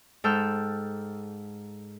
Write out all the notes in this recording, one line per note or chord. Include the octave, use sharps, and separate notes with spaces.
G#2 A4 G5 E6 F6 G6